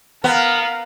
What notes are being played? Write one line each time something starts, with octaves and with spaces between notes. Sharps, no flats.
B3 A#4 F5